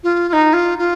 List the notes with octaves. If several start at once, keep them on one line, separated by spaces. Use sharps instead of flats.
F4
F4
D#4
F4
F4